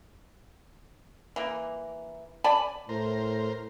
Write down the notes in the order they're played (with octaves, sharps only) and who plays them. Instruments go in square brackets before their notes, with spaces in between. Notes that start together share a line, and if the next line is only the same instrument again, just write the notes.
[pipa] E3 A#3
D5 G#5 A5 B5
[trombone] A2 [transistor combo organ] A#4 C5